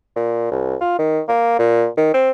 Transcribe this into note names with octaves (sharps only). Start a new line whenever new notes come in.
A#2
C2
F4
D#3
A#3
A#2
D#3
C4